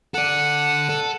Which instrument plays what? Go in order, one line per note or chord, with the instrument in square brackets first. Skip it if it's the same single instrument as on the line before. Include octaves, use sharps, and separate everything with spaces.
[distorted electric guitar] A4 D5 [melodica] F#5
[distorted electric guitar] A4